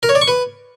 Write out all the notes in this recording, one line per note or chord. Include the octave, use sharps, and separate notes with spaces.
A#4
C#5
D5
C#6
B4